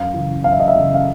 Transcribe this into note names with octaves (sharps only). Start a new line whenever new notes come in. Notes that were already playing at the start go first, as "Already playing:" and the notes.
Already playing: F#2 F5
C#3 E3
F#2 F5
E5
D#5
E5
C#3 E3
F5